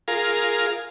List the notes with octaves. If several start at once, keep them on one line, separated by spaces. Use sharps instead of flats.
F4 G#4 A#4 F5